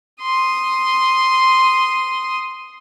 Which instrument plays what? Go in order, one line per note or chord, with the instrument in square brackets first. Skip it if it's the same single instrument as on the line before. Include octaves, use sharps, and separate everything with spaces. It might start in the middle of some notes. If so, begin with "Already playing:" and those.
[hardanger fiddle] C6 D#6